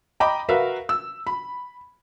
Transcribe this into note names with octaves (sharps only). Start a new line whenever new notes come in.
D#5 G5 A#5 B5 D6
F#4 A#4 B4 E5 F5
E6
B5